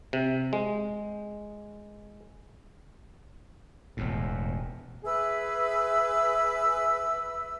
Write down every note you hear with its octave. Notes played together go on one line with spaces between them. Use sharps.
C3
G#3
E1 E2 A2
G#4 B4 E5 E6